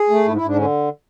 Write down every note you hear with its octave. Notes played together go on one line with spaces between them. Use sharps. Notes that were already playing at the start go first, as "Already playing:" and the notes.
Already playing: G#4
A3
G#2 E4
E4
G#2 D4
D3 C#4